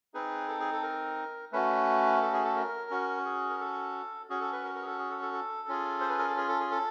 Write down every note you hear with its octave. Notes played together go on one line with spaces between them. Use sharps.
C4 D#4 G#4 B4
A4
G#4
A4
A#4
A3 C#4 F#4 B4
A4
G#4
A4
A#4
C#4 F#4
G#4
A#4
A4
C#4 F#4 G#4
A4
B4
A#4
A#4
G#4
A4
G#4
A4
A4
A4
C#4 F4 G#4
C5
B4
A#4
A4
G#4
A4
G#4
A4